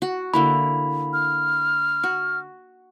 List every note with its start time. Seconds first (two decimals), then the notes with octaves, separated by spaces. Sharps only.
0.02 F#4
0.34 D3 A#3 E4 B5
1.13 F6
2.03 F#4